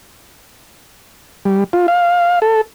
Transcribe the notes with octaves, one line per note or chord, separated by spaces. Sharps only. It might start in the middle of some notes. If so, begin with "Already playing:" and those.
G3
F4
F5
A4